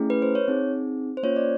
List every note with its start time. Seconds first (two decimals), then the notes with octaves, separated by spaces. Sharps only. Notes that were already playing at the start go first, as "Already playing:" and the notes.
Already playing: A3 C#4 E4 G#4
0.10 B4
0.22 C5
0.35 C#5
0.48 C4 D#4 G#4
1.17 C5
1.23 A#3 C#4 F4 C#5
1.36 D5